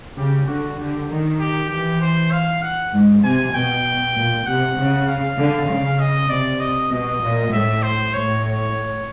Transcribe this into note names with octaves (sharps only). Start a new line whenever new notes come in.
C#3 G4
D3 F#4
D3 G4
D#3
G4
E3 G4
C5
F5
F#5
G#2
C3 G#5
B2 G5
A#2
C3 F#5
C#3
F5
D3
C#3
D#5
C3 D5
D#5
B2 D#5
A#2
A2 E5
C5
A2 C#5
C#5